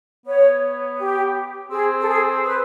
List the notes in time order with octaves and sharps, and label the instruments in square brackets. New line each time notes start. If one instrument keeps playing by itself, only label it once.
[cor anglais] B3 [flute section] C#5
[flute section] G4
[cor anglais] C4 [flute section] G#4
[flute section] A4
G#4
B4